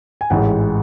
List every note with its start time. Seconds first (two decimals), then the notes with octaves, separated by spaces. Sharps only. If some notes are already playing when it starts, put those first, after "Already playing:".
0.21 G#5
0.30 A1 G#2 E3 G#3 F#5